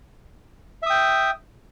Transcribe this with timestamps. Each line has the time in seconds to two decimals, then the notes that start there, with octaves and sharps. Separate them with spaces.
0.83 E5
0.86 D#6
0.90 G5